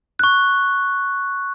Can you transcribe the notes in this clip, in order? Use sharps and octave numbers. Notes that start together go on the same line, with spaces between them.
C#6 F#6